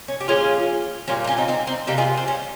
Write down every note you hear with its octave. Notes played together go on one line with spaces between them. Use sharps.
C#4
G4
A#2 F3 G#3 C#4 F4
A#2 G3 A#3 C#4 F4
D#4
C#4 F4
C4 D#4
C4 D#4
C4 D#4
C3 G3 A#3 D#4 G4
F4 G#4
C4
C#4